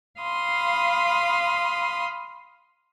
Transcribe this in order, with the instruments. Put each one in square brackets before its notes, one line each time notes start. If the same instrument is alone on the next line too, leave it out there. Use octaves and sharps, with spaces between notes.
[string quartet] F5 B5 C6 D#6